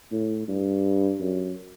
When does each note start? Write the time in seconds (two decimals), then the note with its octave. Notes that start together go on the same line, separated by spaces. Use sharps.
0.11 A2
0.48 G2
1.20 F#2